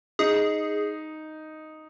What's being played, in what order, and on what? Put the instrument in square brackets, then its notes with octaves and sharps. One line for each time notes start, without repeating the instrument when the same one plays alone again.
[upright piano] D#4 [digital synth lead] G#4